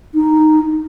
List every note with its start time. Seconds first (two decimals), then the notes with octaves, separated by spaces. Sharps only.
0.14 D#4